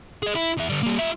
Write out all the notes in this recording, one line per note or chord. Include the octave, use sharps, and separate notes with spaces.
G#4 D#5
E4
E2 E5
D3 G3
G3 A#3
F4 E5